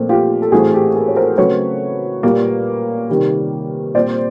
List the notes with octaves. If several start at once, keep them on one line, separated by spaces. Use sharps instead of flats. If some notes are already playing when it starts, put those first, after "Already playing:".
Already playing: A#2 F3 A3 C4
F4 G4
A4
A2 E3 A3 C4 F#4 G#4
G4 A4
G#4 A#4
C#5
A#4 C5
C#3 F#3 A3 C4 B4 C#5
A#2 G3 A#3
C3 D#3 G3
A#2 G3 C4 C5 D5